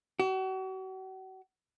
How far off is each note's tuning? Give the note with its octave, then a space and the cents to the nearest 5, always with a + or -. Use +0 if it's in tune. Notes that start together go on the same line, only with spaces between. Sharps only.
F#4 +40